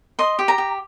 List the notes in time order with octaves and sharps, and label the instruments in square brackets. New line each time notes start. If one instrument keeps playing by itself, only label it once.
[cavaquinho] D#5 C6
G4
A#5
G4